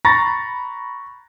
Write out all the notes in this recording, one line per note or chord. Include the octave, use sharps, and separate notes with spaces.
A#5 B5 C#6 A6 A#6